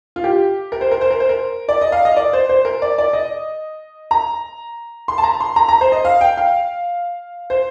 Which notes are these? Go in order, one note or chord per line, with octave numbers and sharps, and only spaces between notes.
F4
G4
A#4
C5
A#4
C5
A#4
C5
A#4
D5
D#5
F5
D#5
D5
C5
C5
A#4
D5
D5
D#5
A#5
C6
A5
A#5
C6
A#5
A#5
C5
D#5
F5
G5
F5
C5